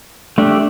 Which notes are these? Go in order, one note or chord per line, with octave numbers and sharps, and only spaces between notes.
A3 D4 G4